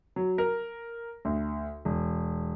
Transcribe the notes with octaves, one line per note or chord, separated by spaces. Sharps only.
F#3
A#4
D2
E1